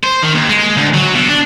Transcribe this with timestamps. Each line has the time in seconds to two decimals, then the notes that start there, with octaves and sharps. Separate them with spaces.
0.04 C5
0.23 D#3
0.35 D#2
0.50 G#3
0.77 D2
0.94 F#3
1.15 B2
1.29 D4